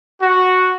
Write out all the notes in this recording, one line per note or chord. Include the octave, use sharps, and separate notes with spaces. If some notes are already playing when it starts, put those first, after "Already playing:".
F#4